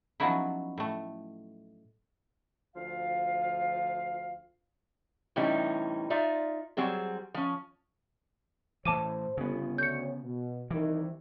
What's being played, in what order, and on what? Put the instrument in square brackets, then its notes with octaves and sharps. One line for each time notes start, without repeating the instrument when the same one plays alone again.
[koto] F3 F#3 B3 C#4 D#4 E4
A2 A3
[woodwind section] D2 F3 F4 F5
[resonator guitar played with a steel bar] A2 C3 E3 G3 C#4 D#4
D#4 F4 D5 E5
F#3 G3 C4 G#4
F3 C#4
[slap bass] A2 E3 [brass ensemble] C5 [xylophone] A5 D6 D#7
[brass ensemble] G1 [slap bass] C#3 B3
[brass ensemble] D2 C#5 [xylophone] G6 C#7
[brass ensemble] B2
[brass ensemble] C2 C3 D#3 [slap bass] E3